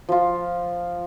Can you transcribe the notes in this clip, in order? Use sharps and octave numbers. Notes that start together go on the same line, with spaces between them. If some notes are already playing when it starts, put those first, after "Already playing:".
F3 F4